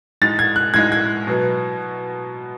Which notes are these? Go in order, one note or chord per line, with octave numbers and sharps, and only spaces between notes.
A2 G#3 D#4 A6
G#6
F#6
A2 G#3 D#4 G#6
G#6
B2 F#3 B3